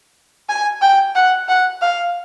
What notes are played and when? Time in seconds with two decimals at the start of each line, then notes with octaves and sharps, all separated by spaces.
0.49 G#5
0.82 G5
1.15 F#5
1.48 F#5
1.82 F5